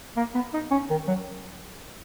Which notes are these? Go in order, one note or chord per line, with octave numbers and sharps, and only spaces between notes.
A#3
B3
D#4
C#4
D#3
F#3